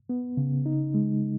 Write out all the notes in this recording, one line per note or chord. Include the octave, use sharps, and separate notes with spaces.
B3
C#3
D#4
G#3